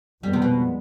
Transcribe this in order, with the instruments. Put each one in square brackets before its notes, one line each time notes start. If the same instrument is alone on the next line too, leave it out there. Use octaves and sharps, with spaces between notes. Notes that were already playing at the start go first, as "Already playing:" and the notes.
[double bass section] F2 D#3 G#3 B3 [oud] G3
[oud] C3
B2